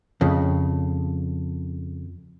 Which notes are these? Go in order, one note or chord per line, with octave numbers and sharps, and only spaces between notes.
F2 C#3